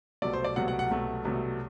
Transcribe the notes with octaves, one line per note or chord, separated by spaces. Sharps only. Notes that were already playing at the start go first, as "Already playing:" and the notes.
C2 B2 F#3 A3 D5
C5
D5
C2 B2 F#3 A3 F#5
F#5
F#5
C2 B2 F#3 A3
C2 B2 F#3 A3